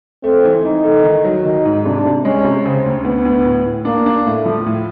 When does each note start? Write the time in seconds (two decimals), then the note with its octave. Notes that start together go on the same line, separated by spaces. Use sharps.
0.24 A3 C4
0.45 E3
0.64 E3 D#4
0.84 A3
1.04 D#3
1.25 F#3
1.45 D#3 D#4
1.65 G#2
1.85 C3 D4
2.05 C3
2.25 G#3 C#4
2.44 C3
2.65 C#3 C4
2.86 D2
3.05 D2 B3
3.25 D2
3.45 A2
3.65 A2
3.85 A#3 D4
4.06 D4
4.25 A2 A3
4.45 F3
4.66 A2